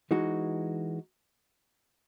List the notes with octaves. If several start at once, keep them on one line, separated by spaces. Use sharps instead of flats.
E3 G#3 D#4 F#4